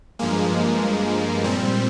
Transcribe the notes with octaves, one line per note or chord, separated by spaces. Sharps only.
G2 F3 G#3 A#3
A#2 G3 C4